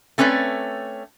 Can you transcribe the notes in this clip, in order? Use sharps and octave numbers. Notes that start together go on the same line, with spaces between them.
A3 C4 C#4 B4 D5